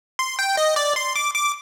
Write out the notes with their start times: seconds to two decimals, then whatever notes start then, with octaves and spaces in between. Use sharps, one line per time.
0.19 C6
0.39 G5
0.57 D#5
0.76 D5
0.96 C6
1.16 D6
1.34 D6